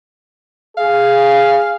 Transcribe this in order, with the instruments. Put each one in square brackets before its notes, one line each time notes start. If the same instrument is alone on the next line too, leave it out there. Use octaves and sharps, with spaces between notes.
[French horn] G#4 [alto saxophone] F5